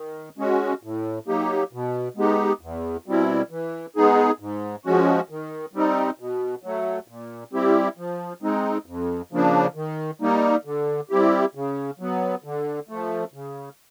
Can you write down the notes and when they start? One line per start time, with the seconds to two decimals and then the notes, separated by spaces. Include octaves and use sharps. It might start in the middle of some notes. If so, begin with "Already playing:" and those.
Already playing: D#3
0.38 G#3 C#4 F#4
0.83 A2
1.27 F#3 A#3 D#4 G4
1.73 B2
2.17 G#3 B3 D#4 G4
2.61 E2
3.06 B2 G3 C4 E4
3.50 E3
3.96 G#3 B3 D#4 G#4
4.40 G#2
4.85 F3 G#3 C#4 F#4
5.30 D#3
5.73 G3 C4 D#4
6.19 B2
6.63 F#3 A3
7.08 A#2
7.52 G3 C4 E4 G4
7.97 F3
8.42 G#3 C4 D#4
8.86 F2
9.32 C#3 F3 A#3 D4
9.75 D#3
10.21 G3 A#3 D#4
10.65 D3
11.09 G3 C4 E4 G4
11.55 C#3
11.99 F#3 B3
12.44 D3
12.89 F3 A3
13.34 C#3